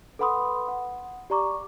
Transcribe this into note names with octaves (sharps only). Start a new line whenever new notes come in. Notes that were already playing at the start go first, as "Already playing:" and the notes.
A4 B4 F#5 B5 C6 D#6
F#5
G4 D5 A#5 C#6 D6